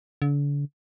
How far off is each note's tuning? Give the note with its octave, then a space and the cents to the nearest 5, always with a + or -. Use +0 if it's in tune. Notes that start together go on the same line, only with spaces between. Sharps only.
D3 -40